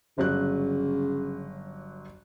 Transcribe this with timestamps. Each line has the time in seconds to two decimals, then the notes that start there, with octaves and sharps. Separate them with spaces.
0.18 G1 C#3 F#3 F#6